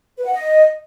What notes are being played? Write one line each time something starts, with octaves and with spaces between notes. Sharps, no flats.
B4
F#5
D#5